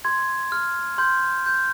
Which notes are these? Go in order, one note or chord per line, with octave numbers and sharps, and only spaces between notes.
C6 G#6
F6
C6 G6
G6